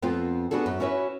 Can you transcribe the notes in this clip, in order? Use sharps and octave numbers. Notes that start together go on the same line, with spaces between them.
F2 B3 C4 F4
B3 D4 F#4 G#4 A4
F#2
C#4 E4 F#4 B4 C#5 E5